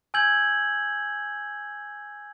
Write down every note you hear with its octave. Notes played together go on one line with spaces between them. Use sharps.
G#5 E6 G6 G#6 F#7